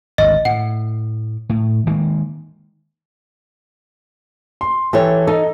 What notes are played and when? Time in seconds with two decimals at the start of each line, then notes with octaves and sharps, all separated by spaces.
0.18 G#1 D2 D#5
0.45 A2 F#5
1.49 A2
1.87 D#3 G#3 A#3
4.61 C6
4.93 E3 G4 A4 C#5
5.27 D#4 A4 D#5